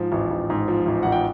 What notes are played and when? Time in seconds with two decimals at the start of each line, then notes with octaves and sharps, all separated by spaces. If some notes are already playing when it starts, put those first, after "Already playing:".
Already playing: G#2 F3
0.12 A1
0.31 A1
0.50 G#2
0.68 F3
0.86 A1
1.03 A1 F#5
1.12 G5